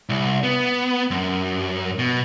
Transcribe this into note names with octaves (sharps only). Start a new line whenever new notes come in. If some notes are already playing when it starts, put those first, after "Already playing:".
C2
B3
F#2
B2